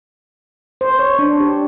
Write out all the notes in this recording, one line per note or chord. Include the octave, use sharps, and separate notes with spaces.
C5
C#5
D4
G4